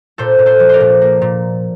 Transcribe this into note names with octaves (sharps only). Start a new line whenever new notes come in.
A#2 A4 C5
A#2
A4 C5
F3
A#4 C5 D5
A#2
A#3
A#2